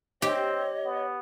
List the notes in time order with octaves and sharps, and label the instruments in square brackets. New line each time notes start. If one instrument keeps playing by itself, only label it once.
[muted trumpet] C4 [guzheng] G4 [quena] C#5 [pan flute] D#5
[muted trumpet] B3